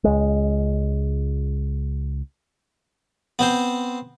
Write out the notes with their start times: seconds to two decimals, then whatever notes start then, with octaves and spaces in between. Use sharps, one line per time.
0.04 C#2 G#3
3.39 B3 C4 C5